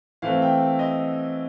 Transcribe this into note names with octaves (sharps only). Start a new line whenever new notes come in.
E3 A3 C4 F5
G5
D#5